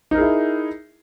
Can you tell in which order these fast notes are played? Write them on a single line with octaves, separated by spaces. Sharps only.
D#4 A#4 G#4 E4